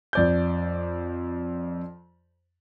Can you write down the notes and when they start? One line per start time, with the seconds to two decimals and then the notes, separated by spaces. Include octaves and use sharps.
0.13 F2 D5 G6